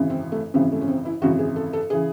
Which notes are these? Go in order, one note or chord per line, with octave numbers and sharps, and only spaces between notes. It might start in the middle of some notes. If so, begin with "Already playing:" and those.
Already playing: G#1 F#2 C#3 E3
C4
A3
G#1 F#2 C#3 E3 C4
A3
C#4
C4
E4
G#1 F#2 C#3 E3 F#4
G#4
A4
A4
C#3 E3 G#4